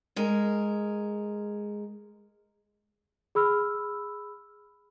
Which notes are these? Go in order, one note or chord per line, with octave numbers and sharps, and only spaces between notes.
G#3 A#4
G#4 B5 E6 F6